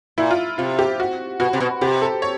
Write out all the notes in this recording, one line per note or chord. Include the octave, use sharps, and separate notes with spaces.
A#2 E4
F4
C3 F4
G4
F#4
B2 F#4
C3
B2
C3 G4
A4
C#5